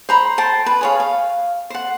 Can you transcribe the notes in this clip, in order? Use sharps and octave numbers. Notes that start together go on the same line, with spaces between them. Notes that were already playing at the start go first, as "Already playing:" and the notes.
C5 A#5 B5
C5 G5 A5
B4
G#4 C#5 F5
F5
C5 F#5